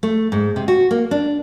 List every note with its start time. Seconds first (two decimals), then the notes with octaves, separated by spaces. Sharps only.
0.03 A3
0.32 G#2
0.56 C3
0.68 F#4
0.91 A#3
1.11 D4